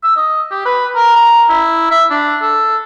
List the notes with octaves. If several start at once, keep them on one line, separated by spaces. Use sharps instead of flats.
E6
D#5
G4
B4
A#4
A#5
E4
E5
D4
A4